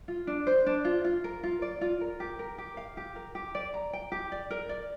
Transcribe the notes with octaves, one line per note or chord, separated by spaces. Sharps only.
F4
D4
C5
D4
F4
F4
A#4
F4
D5
F4
A#4
G4
A#4
G4
F5
G4
A#4
G4
D5
A#5
G5
G4
D5
A#4
D5